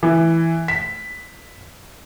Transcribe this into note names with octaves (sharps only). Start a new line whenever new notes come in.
E3
B6